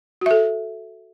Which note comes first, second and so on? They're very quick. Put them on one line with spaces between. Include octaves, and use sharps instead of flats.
F#4 E5 A4